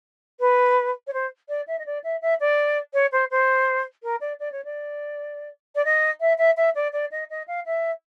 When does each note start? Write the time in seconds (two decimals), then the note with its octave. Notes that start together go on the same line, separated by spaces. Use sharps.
0.39 B4
1.07 C#5
1.13 C5
1.48 D5
1.67 E5
1.78 D#5
1.85 D5
2.03 E5
2.21 E5
2.40 D5
2.93 C#5
3.11 C5
3.30 C5
4.03 A#4
4.20 D5
4.39 D5
4.51 C#5
4.64 D5
5.75 D5
5.84 D#5
6.20 E5
6.38 E5
6.56 E5
6.75 D5
6.92 D5
7.11 D#5
7.30 D#5
7.47 F5
7.65 E5